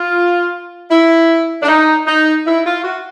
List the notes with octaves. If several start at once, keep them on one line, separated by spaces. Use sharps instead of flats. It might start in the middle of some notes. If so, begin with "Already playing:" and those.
Already playing: F4
E4
D4
D#4
D#4
E4
F4
F#4